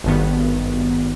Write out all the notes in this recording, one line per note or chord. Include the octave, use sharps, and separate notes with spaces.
G#1 G2 D#3 B3